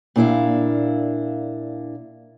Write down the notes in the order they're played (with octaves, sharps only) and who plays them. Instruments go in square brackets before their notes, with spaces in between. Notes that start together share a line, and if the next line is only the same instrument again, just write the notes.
[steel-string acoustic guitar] A#2 D4 E4 F5